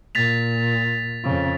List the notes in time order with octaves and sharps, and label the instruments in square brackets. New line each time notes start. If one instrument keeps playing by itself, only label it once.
[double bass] A#2 [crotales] A6 B6 F7
[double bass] F2 C#3